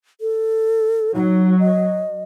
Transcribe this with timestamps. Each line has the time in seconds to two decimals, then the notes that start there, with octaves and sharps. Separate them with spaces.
0.21 A4
1.15 F#3 D#4
1.59 D#5